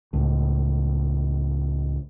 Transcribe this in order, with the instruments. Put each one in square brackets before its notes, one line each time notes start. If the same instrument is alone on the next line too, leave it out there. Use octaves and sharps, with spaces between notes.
[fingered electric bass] C#2 A2